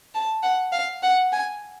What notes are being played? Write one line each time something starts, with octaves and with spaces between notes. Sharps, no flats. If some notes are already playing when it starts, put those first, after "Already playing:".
A5
F#5
F5
F#5
G#5